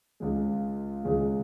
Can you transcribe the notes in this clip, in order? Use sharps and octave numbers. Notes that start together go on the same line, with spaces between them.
C#2 C#3 G#3
C#2 C#3 G#3